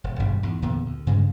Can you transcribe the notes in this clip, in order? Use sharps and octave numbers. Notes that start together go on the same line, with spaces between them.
D#1
G#1 G2 B2 G3
E2 G#2
E2 A#2 D3 B3
D2
G2 C#3 G#3